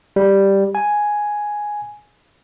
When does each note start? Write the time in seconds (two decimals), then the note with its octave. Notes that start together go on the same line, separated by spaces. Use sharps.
0.16 G3
0.75 G#5